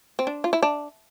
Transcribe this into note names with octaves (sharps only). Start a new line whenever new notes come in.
C4
D4
F4
E4
D4